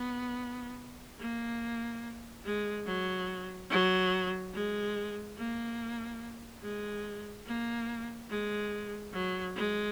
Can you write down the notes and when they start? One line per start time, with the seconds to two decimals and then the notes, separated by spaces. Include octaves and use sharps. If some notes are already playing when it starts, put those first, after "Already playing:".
Already playing: B3
1.20 A#3
2.45 G#3
2.86 F#3
3.70 F#3
4.53 G#3
5.37 A#3
6.62 G#3
7.46 A#3
8.30 G#3
9.13 F#3
9.55 G#3